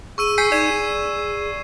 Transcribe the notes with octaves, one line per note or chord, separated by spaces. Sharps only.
G#4 C#6 E6 D#7
G#5 G6 B6 C7
D#4 D5 G#6 E7
G#4